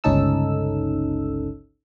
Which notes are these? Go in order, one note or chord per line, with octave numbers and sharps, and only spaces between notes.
G1 C#2 C#4 D#4 A4 E6